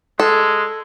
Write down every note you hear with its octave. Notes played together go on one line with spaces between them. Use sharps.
G#3 A4